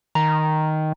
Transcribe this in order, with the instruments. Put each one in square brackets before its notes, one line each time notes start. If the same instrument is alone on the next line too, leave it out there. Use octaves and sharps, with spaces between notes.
[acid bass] D#3 [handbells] A#5